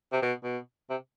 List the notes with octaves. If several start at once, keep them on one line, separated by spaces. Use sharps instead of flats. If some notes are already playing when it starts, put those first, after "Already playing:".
C3
B2
B2
C3